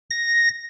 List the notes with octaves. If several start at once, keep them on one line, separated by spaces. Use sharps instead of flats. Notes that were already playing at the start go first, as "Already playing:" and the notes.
A#6